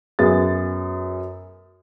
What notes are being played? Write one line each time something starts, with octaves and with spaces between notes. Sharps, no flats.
F#2 B3 G#4 A6